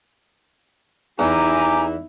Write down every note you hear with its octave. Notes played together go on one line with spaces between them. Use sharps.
E2 D#4 E4 G4 G#5 A#5